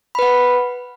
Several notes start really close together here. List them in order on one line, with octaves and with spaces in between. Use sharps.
B5 B4 F#5